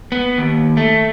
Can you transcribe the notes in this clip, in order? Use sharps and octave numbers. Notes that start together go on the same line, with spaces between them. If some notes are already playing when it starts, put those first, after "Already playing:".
B3
D#2
A3